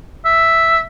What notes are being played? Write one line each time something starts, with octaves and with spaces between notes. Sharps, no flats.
E5